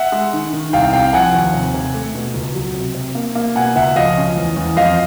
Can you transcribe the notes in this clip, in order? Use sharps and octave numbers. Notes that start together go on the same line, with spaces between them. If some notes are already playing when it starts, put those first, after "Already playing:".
Already playing: E5 F#5
G#3
D#3
D#3
C2 F5 G5
C3 F5 G5
F3 F#5 G#5
D#2
C3
C3
A3
B2
C#2
F#3
C3
C3
A#3
A#3
B2 F#5 G#5
C#2 E5 F#5
F3 D#5 F5
C#4
E2
E2
F2 D#5 F5